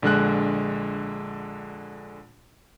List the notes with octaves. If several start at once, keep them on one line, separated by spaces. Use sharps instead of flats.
A#1 D3 G#3 F#6